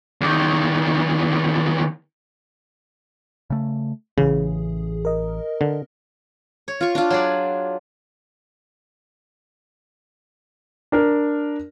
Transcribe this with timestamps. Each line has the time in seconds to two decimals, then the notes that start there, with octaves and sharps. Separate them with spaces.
0.21 E2 D#3
3.50 C#3 A3
4.18 A1 C#3 E3 G#4
5.05 A#4 D#5
5.61 D3
6.68 C#5
6.81 F4 C#6
6.95 D4 F4
7.10 F#3 G#4 D5
10.92 D4 A#4